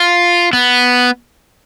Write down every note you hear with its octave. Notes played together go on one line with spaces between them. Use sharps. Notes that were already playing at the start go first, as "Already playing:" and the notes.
Already playing: F4
B3